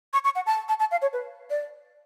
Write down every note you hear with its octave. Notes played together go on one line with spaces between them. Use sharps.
C#6
C#6
F#5
A5
A5
A5
F5
C#5
B4
D5